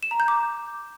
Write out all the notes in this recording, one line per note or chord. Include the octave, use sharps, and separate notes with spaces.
E7
A#5
G6
D6